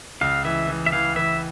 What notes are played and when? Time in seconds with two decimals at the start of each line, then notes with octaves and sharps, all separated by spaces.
0.21 C#2 F5
0.45 E3 E5
0.68 E3
0.86 E5
0.92 E3 F5
1.16 E3 E5